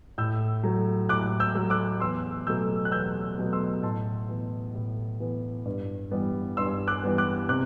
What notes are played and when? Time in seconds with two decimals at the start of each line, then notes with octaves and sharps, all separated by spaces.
0.18 A2 E6 G6
0.64 F#3 A3
1.09 A2 D6 F#6
1.40 E6 G6
1.55 F#3 A3
1.70 D6 F#6
2.00 E2 C6 E6
2.47 B2 F#3 A3 E6 G6
2.85 F#6
2.92 E2 E6 G6
3.38 B2 F#3 A3
3.53 C6 E6
3.83 A2 A5 C6
4.29 E3 B3
4.75 A2
5.20 E3 B3
5.65 G2
6.11 E3 G3 B3
6.57 G2 C6 E6
6.87 D6 F#6
7.03 E3 G3 B3
7.18 D6 F#6
7.49 C3 D6 F#6